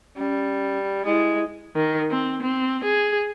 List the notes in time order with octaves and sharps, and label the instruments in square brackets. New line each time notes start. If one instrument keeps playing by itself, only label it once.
[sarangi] G3 [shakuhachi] C#4
[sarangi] G#3 [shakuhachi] E4
[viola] D#3
C4
C4
G#4